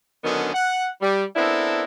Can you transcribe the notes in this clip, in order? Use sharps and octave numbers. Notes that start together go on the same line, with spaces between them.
D3 D#3 F#3 B3 C#4 D4
F#5
G3
B3 C4 D4 E4 A4 A#4